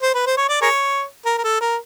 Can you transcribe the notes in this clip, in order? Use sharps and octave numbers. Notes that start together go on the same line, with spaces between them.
C5
B4
C5
C#5
D5
G#4 A#4 C#5
A#4
A#4
A4
A#4